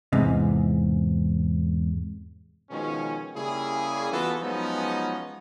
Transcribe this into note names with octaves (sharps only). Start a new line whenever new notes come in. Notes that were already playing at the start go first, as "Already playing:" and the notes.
E2 G#2 C3
B2 D#3 F3 G#3 C#4
C#3 G3 A#3 E4 G#4
E3 B3 F4 F#4 A4
F3 F#3 G#3 B3 C#4 D#4